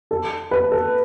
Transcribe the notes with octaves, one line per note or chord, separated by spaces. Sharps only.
A4
B4
A4